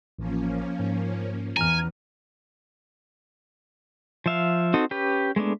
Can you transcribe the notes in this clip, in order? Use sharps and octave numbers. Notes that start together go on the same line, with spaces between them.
A1 F3 A#3 C#4
G#2
E2 G#5 A#5 F6
F3 E5 F5
C4 D#4 F#4 A4
C#4 G4 B4
G#3 A3 B3 D4